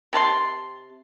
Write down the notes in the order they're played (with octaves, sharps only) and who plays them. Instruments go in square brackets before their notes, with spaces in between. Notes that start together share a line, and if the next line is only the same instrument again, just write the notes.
[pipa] C3 A5 B5 C6